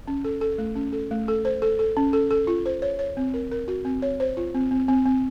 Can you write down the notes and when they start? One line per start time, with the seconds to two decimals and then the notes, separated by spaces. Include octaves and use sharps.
0.08 C#4
0.24 A4
0.41 A4
0.58 A3
0.76 C#4
0.93 A4
1.11 A3
1.28 A4
1.45 C5
1.62 A4
1.79 A4
1.97 C#4
2.13 A4
2.31 A4
2.47 F4
2.66 C5
2.82 C#5
2.99 C#5
3.17 C4
3.34 A#4
3.51 A#4
3.68 F#4
3.85 C4
4.02 C#5
4.20 C5
4.37 F4
4.54 C4
4.71 C4
4.88 C4
5.06 C4